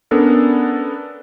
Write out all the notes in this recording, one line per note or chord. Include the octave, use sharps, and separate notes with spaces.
B3 C#4 D4 A4 A#4